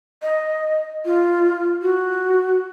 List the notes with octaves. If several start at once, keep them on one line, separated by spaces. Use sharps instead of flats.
D#5
F4
F#4